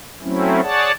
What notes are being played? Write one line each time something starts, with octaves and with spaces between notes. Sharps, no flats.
F#3 A3 C4 C#4 E4
G#4 C#5 D5 F#5 A5